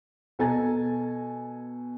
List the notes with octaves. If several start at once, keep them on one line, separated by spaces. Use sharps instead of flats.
B2 A4 G#5 A#5 A6